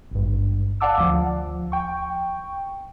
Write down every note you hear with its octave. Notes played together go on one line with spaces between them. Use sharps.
G#1 G2
D5 F5 F#5 A5 D6 E6
D2 F3
G5 C#6